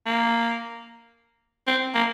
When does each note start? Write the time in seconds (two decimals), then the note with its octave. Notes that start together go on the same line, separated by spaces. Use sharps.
0.06 A#3
1.67 C4
1.94 A#3